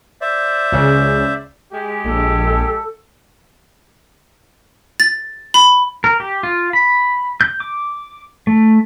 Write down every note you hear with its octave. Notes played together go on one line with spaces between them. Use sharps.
C5 D5 E5
C#2 C#3
G#3 G4
A#1 A4
A6
B5
A#4
G4
F4
B5
G6
D6
A3